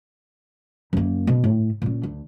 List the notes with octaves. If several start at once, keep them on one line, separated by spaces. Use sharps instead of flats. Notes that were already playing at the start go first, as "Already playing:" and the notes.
F#2 A#3
B2
A2
A#2 C#4
D2